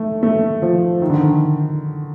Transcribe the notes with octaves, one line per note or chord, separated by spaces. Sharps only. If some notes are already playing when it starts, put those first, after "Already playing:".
Already playing: A3
A3
F3
D#3
D3
D#3